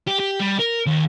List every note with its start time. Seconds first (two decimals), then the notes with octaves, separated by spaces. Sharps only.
0.08 G4
0.20 G4
0.40 G3
0.59 A#4
0.86 D#2